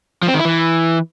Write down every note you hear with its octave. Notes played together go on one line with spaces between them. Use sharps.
F3
C4
D#3
E4
E3